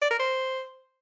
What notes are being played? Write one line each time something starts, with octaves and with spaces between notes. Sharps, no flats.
D5
A#4
C5